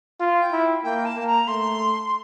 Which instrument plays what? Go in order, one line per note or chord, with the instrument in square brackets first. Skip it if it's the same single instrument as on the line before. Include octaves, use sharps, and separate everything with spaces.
[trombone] F4
[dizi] G5
[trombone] E4
[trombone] A#3 [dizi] G5
[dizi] A5
[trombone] A#3
[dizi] A#5
[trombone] A3 [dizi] C6